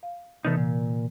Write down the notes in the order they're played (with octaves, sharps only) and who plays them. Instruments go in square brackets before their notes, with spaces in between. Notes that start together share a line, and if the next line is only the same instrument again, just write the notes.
[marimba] F5
[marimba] C3 E3 [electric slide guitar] A3 B3 D#4
[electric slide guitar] A#2